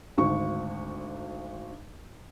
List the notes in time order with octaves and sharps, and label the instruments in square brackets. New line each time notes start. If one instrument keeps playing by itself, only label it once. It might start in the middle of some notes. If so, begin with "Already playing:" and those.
[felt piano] G#1 D2 C#6